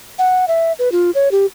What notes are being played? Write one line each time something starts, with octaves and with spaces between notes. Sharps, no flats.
F#5
E5
B4
F4
C#5
G4